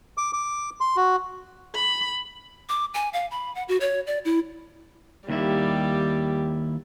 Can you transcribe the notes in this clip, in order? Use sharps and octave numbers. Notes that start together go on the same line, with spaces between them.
D6
D6
C6
F#4
B5
D6
G#5
F5
B5
F#5
F#4
C#5
D5
E4
D#2 D#3 G3 E4 G4